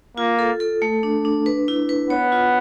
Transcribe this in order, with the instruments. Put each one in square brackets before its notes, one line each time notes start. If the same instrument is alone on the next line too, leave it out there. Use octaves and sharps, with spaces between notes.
[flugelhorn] A#3 [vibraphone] F4
[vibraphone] A4
A4
A3
D4
D4
B4
E4
B4
[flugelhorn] B3 [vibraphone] C#5
[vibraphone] F4